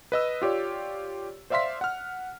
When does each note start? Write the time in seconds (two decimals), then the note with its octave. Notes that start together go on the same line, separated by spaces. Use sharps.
0.12 B4 D#5 E6
0.42 F4 G4 C#5 D5
1.50 C5 D5 E5 F5 C6 B6
1.81 F#5 F6